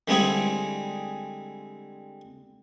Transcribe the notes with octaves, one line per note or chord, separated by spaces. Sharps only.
D3 G3 G#3 C4 E4 G#4